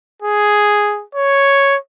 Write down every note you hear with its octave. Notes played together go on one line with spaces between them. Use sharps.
G#4
C#5